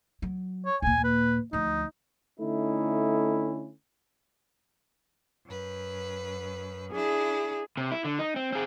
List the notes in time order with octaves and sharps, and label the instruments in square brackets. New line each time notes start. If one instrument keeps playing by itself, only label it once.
[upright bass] F#3
[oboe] C#5
[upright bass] D#2 A#2 [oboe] G#5
[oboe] B4
[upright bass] D2 F3 [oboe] D#4
[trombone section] D3 A3 C#4 D#4 E4
[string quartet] F#2 B4
[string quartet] D4 E4 [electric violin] G#4
[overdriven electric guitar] C3
E4
D3
D#4
C4
C4 G#4